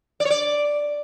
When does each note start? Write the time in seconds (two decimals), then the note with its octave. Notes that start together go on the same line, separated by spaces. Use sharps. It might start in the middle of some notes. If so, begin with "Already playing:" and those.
0.20 D5
0.25 C#5
0.30 D5